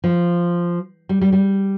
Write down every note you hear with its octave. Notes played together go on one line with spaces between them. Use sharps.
F3
G3
G3
G3